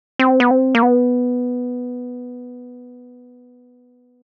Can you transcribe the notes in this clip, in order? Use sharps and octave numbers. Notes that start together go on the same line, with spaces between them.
C4
B3
C4
A#3
B3